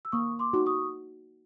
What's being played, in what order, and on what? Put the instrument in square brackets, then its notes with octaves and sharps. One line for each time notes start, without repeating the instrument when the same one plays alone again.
[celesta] E6
[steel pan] A#3 [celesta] C#6 D#6
[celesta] C6 D6
[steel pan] D#4 F#4
[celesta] C#6 D#6